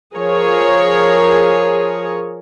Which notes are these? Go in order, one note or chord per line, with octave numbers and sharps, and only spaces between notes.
F3 G#4 A#4 C#5